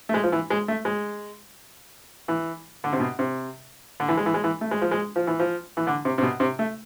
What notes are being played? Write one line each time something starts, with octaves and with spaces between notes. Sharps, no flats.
A3
G#3
F3
E3
G#3
A3
G#3
E3
D3
C3
B2
C3
D3
E3
G#3
E3
G#3
E3
A3
G#3
F3
G#3
F3
E3
F3
E3
D3
C3
C3
B2
C3
A3